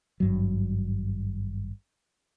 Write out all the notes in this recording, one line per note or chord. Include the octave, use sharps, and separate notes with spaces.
G#1 G2 F#3